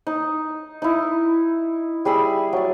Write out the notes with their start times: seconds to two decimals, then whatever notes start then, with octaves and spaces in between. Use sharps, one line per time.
0.07 D#4
0.82 D#4 E4
2.05 G3 G#4 B5 E6
2.53 F#3 D5